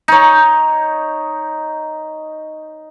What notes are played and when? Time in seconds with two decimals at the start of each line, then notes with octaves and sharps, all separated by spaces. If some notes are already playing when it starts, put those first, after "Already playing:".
0.08 D#4 C#5